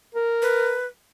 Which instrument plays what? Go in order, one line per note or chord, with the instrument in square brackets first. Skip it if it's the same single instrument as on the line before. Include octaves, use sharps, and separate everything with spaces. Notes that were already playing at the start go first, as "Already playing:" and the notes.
[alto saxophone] A#4
[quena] B4